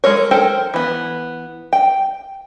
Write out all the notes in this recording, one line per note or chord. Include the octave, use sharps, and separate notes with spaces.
G#3 A4 A#4 C#5
A4 A#4 C5 G5
E3 B3
G5